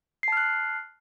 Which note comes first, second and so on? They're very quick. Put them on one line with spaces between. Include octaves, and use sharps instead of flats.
C7 A5 F6 F#6